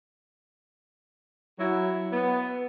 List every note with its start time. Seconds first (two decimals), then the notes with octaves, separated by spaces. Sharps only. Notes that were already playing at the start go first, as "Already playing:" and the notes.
1.59 F#3 E4
2.12 B3